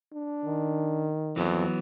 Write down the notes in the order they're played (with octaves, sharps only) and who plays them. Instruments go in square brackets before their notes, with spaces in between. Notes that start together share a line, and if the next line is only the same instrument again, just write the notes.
[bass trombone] D4
[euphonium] D#3
[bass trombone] F2 [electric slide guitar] E3 F#3 B3